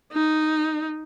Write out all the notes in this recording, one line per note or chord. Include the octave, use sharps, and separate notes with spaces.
D#4